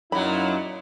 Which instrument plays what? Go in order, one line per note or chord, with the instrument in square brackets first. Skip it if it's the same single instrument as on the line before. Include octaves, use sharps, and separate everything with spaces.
[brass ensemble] F#2 D#4 E4 [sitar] A#2 F#3 [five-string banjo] B5